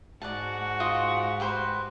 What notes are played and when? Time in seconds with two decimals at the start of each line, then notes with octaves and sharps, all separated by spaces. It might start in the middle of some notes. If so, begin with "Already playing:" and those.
0.22 G#2 F#4 D5 F#5 A5
0.80 F4 D#5
1.40 G4 B4 C5